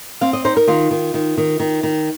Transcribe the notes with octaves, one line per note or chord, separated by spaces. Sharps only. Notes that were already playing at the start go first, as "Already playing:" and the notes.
C4 F5
D#5
D#4 C5
A#4
D#3 F4
D#3
D#3
D#3
D#3
D#3